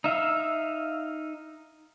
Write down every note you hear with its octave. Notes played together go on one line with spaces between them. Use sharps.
D#4 E5 F5 E6